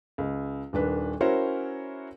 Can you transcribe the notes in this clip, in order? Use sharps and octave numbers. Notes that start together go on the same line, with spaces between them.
C#2
D#1 D#3 D4 B4
C#4 E4 F#4 A#4 C5 C#5